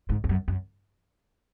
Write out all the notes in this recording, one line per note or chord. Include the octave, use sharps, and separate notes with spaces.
G#2
E2
F#2
F#2